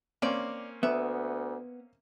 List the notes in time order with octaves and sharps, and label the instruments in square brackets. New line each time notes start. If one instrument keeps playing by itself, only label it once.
[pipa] D#3 D5 [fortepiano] A#3 C4 C#4
[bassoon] D2 [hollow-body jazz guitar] B3 [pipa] E5